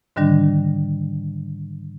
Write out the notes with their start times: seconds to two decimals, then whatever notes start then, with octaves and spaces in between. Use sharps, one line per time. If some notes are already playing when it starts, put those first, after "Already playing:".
0.16 G#2 D3 D#3 G3 D4